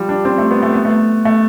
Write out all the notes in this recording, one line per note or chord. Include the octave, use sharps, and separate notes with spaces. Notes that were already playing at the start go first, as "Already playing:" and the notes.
Already playing: F3 G3
D4
C4
A3
B3
A3
B3
A3
A3